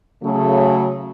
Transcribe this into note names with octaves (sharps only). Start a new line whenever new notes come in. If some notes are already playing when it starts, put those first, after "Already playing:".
C#3 F#3 A3